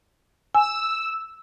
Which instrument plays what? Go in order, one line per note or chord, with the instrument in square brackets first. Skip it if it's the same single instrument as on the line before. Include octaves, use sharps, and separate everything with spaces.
[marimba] G#5 [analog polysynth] E6